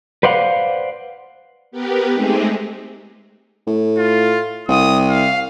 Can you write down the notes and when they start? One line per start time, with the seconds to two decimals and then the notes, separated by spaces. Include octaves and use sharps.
0.23 B4 C5 D5 F5 F#5
1.71 B3 G4 A#4 B4
2.14 G#3 A3 C4 D#4 G4 G#4
3.67 A2
3.98 F4
4.68 C2 D#6
5.10 F5